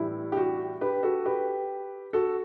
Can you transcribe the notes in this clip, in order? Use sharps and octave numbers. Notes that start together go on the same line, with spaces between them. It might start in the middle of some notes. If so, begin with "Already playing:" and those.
Already playing: A2 E3 G3 E4
G4
F#4
G4 B4
F#4 A4
G4 B4
F#4 A4